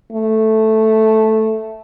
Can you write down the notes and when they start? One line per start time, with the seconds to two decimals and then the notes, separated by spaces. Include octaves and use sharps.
0.12 A3